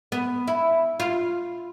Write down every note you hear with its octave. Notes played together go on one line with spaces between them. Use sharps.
B3
E4
F4